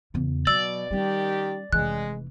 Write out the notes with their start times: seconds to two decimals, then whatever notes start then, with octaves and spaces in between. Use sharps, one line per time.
0.14 E2 C#3
0.47 B2 F#3 D5 E6
0.91 D#3 G3 C#4 G4
1.73 F1 E3 G#3 F#6